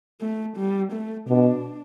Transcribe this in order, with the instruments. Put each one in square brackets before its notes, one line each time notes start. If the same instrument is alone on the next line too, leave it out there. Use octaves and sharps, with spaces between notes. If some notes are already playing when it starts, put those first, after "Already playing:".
[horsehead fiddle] A3
G3
A3
[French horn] B2 [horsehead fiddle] D4